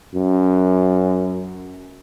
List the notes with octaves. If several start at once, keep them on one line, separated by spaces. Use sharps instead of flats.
F#2